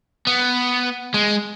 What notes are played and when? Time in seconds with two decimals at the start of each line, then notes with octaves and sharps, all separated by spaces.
0.27 B3
1.14 G#3